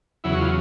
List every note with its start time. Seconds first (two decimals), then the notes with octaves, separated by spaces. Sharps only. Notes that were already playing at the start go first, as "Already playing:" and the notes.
0.24 E2 C#3 F#3 E4
0.33 F#4
0.39 F4